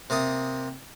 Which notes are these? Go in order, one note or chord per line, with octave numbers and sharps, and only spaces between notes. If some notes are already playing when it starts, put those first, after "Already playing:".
C3 A#3 A5 D#6